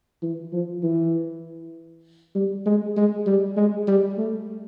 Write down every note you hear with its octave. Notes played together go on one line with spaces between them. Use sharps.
E3
F3
E3
G3
G#3
G#3
G3
G#3
G3
A3